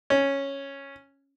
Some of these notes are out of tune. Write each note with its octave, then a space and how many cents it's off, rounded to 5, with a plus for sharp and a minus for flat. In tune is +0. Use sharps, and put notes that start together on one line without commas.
C#4 -5